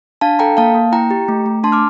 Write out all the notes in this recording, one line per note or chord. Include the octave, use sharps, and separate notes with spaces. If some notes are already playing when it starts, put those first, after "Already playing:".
D4 F5 A5
A4 G5 A#5
A#3 F5 A5
A#3
E4 G5 A#5
G4
A3
A3
D4 A5 C6
D6 F6